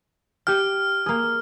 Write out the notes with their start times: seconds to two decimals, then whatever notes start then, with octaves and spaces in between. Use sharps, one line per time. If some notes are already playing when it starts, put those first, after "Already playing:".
0.47 G4 G5 F6
1.06 A#3 G#4